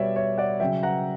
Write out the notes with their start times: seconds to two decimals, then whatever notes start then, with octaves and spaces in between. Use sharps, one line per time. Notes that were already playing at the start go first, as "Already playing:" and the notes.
Already playing: B2 G3 C#5 D5 E5
0.16 C#5 E5
0.38 D5 F#5
0.60 C#3 F#3 E5 G5
0.83 F#5 A#5